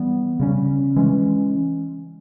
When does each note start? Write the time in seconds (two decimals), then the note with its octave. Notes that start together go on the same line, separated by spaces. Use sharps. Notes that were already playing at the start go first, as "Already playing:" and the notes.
Already playing: E3 G3 B3
0.40 C#3 G3 A#3 C#4
0.96 E3 G#3 C#4